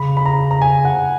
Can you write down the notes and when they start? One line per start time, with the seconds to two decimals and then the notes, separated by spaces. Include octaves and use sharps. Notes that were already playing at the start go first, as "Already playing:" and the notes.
Already playing: C#3 B5
0.17 B5
0.26 A#5
0.51 A#5
0.62 G#5
0.85 F#5